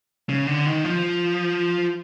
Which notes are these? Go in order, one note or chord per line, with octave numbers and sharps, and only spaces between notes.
C#3
D3
D#3
F3